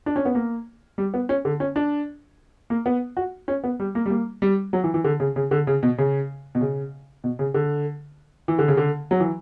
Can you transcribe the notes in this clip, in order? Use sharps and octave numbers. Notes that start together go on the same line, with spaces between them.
D4
C#4
B3
A#3
G3
B3
C#4
D3
C#4
D4
A#3
B3
F#4
C#4
B3
G3
A#3
G3
A#3
G3
F#3
E3
E3
D3
C#3
C#3
D3
C#3
B2
C#3
B2
C#3
B2
C#3
D3
E3
D3
C#3
D3
F#3
E3